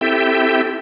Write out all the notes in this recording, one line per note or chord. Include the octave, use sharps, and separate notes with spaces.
C4 E4 G4 A4 E5 G5